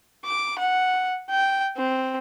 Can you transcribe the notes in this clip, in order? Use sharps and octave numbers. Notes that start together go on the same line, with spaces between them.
D6
F#5
G5
C4